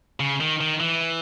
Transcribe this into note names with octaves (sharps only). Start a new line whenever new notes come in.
C#3
D#3
D#3
E3